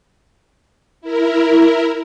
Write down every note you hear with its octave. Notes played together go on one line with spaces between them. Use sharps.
E4 A#4